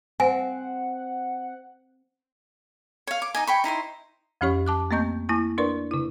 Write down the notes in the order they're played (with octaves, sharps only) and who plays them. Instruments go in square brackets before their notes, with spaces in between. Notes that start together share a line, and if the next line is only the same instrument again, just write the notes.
[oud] C4 [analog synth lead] F#5 [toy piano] G#5
[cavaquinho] C#5 F5
D6
D#4 D#5 G#5
G5 B5 C#6
D#4 E4 C5 C6
[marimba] F2 F3 C#4 G4 C#5 C#6
A5 D6 F#6
A3 A#3 C4 D#5 C#6 G6
A#3 E4 G#5 C#6
D4 A#4 B4 D5 C#6
C#3 E4